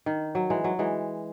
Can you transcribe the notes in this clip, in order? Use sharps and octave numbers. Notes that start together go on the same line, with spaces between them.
D#3
F#3
E3 G#3
F#3
E3 G#3